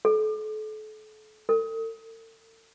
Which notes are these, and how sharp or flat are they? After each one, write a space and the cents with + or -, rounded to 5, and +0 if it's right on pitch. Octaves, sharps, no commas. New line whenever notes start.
A4 -35
A4 +40